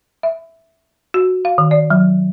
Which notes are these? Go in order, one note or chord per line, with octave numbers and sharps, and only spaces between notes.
E5
F#4
F5
D#3
D5
F#3